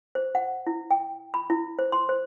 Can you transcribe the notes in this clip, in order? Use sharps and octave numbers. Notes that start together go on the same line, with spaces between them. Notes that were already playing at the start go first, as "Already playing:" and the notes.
C5
F#5
E4
G5
B5
E4
C5
C6
C5